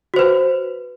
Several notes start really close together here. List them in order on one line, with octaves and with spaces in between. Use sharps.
F#4 C5 B4